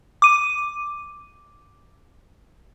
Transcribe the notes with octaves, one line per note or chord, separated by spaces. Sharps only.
D6 D#7